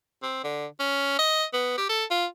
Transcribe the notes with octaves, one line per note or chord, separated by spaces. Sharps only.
C4
D3
C#4
D#5
B3
G4
A4
F4